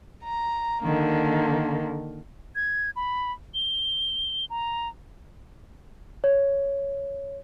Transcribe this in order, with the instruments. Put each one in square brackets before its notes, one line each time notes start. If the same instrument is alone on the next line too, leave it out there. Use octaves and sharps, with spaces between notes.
[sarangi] A#5
[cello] D3 D#3 [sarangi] A#3
[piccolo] G#6
B5
G7
A#5
[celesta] C#5